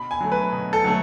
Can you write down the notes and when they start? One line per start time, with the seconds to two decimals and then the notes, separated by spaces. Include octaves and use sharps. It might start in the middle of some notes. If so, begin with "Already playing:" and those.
Already playing: B2 B5
0.11 G#5
0.21 F#3 A3
0.32 B4
0.52 B2
0.73 A4
0.84 F#3 A3